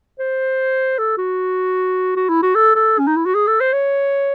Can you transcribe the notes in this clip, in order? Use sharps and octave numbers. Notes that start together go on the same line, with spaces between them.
C5
A4
F#4
F#4
E4
F#4
A4
A4
C#4
D#4
E4
F#4
G#4
A4
C5
C#5